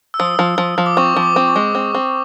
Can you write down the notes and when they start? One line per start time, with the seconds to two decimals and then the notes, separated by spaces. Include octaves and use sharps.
0.14 E6
0.20 F3 D#6
0.39 F3
0.58 F3
0.78 F3
0.86 D6
0.97 C4 C#6
1.16 F3
1.23 D6
1.36 C4
1.48 C#6
1.56 G#3
1.75 C4
1.94 C4